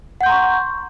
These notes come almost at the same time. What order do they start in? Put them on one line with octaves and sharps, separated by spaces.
F#5 G6 C6 A#5 C#6